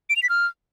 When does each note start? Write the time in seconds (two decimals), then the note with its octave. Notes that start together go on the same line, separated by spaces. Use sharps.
0.10 D7
0.16 F7
0.23 B6
0.29 F6